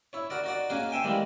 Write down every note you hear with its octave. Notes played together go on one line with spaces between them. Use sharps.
E4 C#5
F#4 A#4 D5
D#4 F#4 D5
A#3 C#4 D#4 F#4 G#4 A#4
C5 E5 G5 G#5
D#3 E3 G3 G#3 A#3 D#4